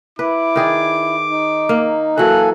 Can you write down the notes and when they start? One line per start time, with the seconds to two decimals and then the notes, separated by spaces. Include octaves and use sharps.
0.19 E4 B4 D6
0.56 D#3 G#4 D5
1.29 D#4
1.69 A#3
2.18 E3 F#3 A#3 A4 G#5 F#6